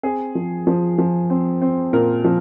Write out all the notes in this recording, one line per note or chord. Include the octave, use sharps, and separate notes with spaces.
C4 G#4
F3
F3
F3
C4
C4
A#2 A#4
F3